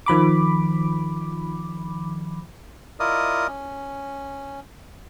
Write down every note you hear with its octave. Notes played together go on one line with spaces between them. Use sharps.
D#3 F3 B5 D6
E4 F4 A#4 D5 D#5 D#6
C#4